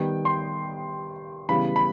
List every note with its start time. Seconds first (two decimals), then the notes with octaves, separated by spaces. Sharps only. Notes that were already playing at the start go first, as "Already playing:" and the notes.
Already playing: D#3 G3 B3 G5
0.25 C6
1.49 C#3 E3 G3 B3 B5
1.76 B5